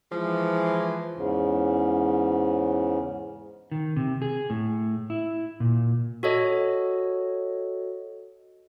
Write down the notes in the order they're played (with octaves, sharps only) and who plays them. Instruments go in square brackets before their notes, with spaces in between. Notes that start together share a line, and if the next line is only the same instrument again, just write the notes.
[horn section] E3 F3 G#3
[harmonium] E2 G#2 C#3
[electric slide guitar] D#3
C3
G#4
A2
E4
A#2
[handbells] F#4 A4 C#5 D#5